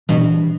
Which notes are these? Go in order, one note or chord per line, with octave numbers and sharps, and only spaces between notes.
B2 E3 G3 D4